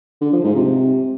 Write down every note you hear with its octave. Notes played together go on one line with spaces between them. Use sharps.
D3
F3
G#2
C3